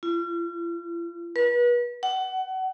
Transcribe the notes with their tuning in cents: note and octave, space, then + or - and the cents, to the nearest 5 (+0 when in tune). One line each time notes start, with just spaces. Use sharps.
F4 -40
B4 -35
F#5 +25